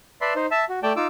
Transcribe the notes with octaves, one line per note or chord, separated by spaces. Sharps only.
B4 D5 E5 A5 B5 C6
D#4 C5
E5 A5
F#4
A3 D5 G5 A5
D#4 F4 D6 E6